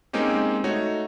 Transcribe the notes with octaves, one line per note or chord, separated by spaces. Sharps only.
G#3 A#3 C4 C#4 D#4 G4
A3 D#4 F#4 C#5